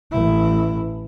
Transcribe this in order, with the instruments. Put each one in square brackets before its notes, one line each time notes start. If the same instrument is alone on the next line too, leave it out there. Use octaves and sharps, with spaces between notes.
[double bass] A1 E4